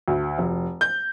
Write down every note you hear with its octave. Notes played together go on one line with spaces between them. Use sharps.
D2
F1
G6